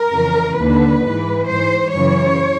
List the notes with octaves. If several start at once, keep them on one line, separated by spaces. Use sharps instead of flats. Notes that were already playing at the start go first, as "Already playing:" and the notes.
Already playing: A#4
F2 C#3 E3
D#2 D3 B4
G#2 E3
G#2 E3 C5
F#2 C#3 E3 C#5